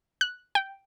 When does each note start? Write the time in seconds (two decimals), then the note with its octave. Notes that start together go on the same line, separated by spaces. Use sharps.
0.21 F#6
0.55 G5